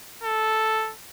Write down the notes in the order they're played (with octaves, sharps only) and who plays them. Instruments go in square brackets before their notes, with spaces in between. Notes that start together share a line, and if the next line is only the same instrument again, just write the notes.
[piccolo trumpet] A4